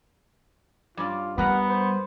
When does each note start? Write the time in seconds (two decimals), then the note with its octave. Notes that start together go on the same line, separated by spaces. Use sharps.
0.97 G2 C#4 F4 D5
1.38 G3 B3 A#4 B4 F#5 A#5
1.68 C5